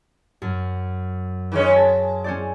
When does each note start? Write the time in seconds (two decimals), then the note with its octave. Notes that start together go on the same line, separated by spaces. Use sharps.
0.42 F#2
1.52 D#3 G#3 C#4
1.73 G#3 E5 A5
2.24 C#4 C5 D5